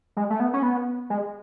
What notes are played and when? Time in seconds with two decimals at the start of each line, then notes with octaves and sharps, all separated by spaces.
0.17 G#3
0.30 A3
0.40 B3
0.54 C#4
0.63 B3
1.10 G#3